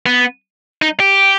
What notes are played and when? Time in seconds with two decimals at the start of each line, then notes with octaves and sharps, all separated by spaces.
0.06 B3
0.82 D#4
1.00 G4